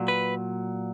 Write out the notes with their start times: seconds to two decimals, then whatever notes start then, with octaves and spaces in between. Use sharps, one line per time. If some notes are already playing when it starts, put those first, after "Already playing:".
Already playing: A#2 F#3
0.08 B4